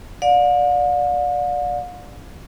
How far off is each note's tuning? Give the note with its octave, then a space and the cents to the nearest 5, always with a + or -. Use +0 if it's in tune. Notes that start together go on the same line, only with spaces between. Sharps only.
D5 +0 F5 +45